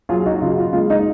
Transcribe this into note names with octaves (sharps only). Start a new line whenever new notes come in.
F#3 F4 G#4
D#4 F#4
C#3 F4
F4
G#3 F4
D#4